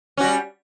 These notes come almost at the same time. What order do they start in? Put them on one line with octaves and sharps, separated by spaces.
C#4 F#4 G3